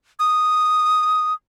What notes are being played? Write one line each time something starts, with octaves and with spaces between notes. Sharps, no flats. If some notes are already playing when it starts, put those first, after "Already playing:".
D#6